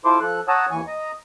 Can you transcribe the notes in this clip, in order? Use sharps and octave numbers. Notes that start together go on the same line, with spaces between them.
E4 F4 A4 C5 C6 D6
F3 A4 F#6
C#5 F#5 A5 A#5 D#6 E6
D#2 E3 G#5 C#6
D#5 A#5